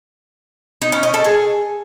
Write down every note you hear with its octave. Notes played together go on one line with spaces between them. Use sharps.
D#4
C#4
D#5
A4
G#4